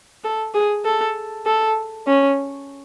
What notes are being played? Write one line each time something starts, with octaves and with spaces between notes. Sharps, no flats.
A4
G#4
A4
A4
C#4